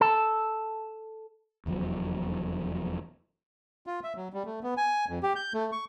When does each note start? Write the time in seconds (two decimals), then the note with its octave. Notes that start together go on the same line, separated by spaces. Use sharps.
0.01 A4
1.66 F1 E2 F3 F#3
3.87 F4
4.04 E5
4.16 F#3
4.34 G3
4.46 A3
4.63 B3
4.77 G#5
5.09 F2
5.23 G4
5.36 G6
5.54 A3
5.72 C#6